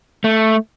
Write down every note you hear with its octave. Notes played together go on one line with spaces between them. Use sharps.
A3